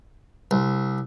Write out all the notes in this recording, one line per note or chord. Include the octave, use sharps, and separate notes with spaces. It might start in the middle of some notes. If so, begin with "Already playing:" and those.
C2